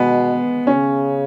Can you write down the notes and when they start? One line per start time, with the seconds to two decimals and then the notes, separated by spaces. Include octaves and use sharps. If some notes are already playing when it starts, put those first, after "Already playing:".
Already playing: B2 G#3 B3
0.67 C#3 C#4